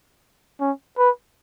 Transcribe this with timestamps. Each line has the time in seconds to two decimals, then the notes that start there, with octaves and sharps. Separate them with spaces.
0.61 C#4
0.98 B4